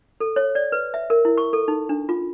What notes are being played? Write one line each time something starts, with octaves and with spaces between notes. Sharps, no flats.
A4
C#5
D5
B4
E5
A#4
E4
C#6
A4
D#4
D4
F4